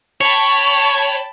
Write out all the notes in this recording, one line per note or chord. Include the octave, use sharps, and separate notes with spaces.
C#5 G5 A5 B5